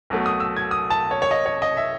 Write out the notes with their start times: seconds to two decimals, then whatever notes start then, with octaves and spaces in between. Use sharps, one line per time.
0.10 B1 B2 F#3 A3
0.26 D#6
0.40 E6
0.57 G#6
0.71 D#6
0.90 A5
1.11 C#5
1.22 C#5
1.31 D#5
1.46 C#5
1.62 D#5
1.77 E5